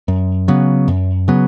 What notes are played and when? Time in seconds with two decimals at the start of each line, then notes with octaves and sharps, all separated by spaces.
0.08 F#2
0.48 C#3 F#3 B3
0.88 F#2
1.28 C#3 F#3 B3